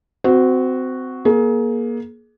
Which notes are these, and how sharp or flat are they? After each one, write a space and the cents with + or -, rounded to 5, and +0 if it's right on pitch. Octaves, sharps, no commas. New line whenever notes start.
C4 -25 F#4 +0
A#3 +25 G#4 +30